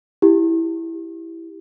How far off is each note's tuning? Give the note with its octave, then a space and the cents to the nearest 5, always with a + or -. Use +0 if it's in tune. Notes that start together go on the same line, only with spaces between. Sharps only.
E4 +0 G4 +0